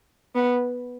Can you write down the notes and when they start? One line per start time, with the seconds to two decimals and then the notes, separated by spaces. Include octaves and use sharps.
0.35 B3